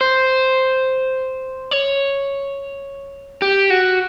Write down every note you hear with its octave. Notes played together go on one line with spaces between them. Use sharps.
C5
C#5
G4
F#4